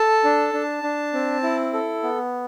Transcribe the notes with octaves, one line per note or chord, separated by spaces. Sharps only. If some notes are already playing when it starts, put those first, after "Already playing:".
Already playing: A4 A5
D4
D4
D4
C4
E4
A4
B3